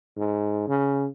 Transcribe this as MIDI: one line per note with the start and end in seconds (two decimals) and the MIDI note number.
0.17 0.67 44
0.68 1.07 49